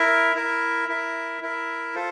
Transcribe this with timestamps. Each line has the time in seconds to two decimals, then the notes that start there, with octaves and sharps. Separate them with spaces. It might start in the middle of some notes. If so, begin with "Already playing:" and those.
Already playing: E4 A#4 E5
0.35 E4 A#4 E5
0.89 E4 A#4 E5
1.42 E4 A#4 E5
1.95 F4 A4 C5